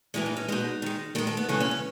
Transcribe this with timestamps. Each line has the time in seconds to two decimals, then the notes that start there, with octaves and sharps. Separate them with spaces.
0.14 A2 E3 G#3 E4
0.26 D#4
0.37 C#4
0.48 B2 G#3 D#4
0.82 D#3 G#3
1.15 D#3 G#3 A3
1.27 A3
1.37 B3
1.49 C#3 E3 G#3 A3
1.60 C#4
1.71 C#4